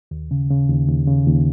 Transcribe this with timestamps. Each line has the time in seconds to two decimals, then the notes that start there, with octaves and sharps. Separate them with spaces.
0.11 D#2
0.31 C#3
0.50 C#3
0.69 D#2
0.88 D#2
1.07 C#3
1.27 D#2